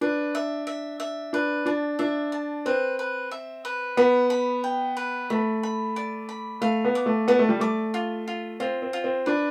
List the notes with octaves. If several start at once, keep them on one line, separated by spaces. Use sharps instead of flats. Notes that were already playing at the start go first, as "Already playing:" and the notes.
D4 B4
E5
E5
E5
D4 B4
D4 A5
D4 E5
A5
C4 B4
B4
E5
B4
B3 B5
B5
G5
B4
A3 B5
B5
D5
B5
A3 F5
B3
D6
A3
B3 D5
A3
G3
A3 D6
F4
F4
C4 F4
C4
F4
C4
D4 B4